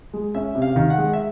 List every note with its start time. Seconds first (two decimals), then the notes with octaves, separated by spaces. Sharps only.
0.14 G#3
0.35 C#4 E5
0.55 C3
0.62 F5
0.76 D#3
0.90 F#5
0.98 G#3
1.13 E5